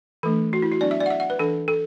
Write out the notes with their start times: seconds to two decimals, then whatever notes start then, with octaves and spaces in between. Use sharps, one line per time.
0.23 E3 A3 D4 A4
0.53 F#4
0.62 E4
0.72 F#4
0.81 F#3 B3 D4 D5
0.91 E5
1.00 D5
1.06 F#5
1.10 E5
1.20 F#5
1.30 B4
1.39 E3 D4 A4
1.68 A4